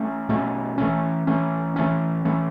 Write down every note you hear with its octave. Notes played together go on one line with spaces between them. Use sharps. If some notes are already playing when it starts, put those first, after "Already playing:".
Already playing: A3 C#4
B2 A3 C#4
E3 A3 C#4
E3 A3 C#4
E3 A3 C#4
E3 A3 C#4